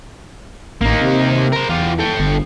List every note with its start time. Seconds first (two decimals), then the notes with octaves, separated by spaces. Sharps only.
0.81 A1 A#3 D#4
1.01 C3
1.52 A#4 C5
1.69 E2 F4 G4
1.99 A4 G5
2.19 G1